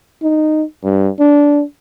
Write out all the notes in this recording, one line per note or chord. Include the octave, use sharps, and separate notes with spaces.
D#4
G2
D4